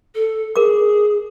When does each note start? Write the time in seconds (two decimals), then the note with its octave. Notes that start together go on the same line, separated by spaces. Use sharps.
0.14 A4
0.56 G#4 A#4 D6